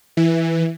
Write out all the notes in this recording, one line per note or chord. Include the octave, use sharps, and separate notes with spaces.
E3